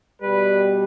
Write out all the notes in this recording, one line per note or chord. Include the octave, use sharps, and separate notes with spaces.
B2 G3 B4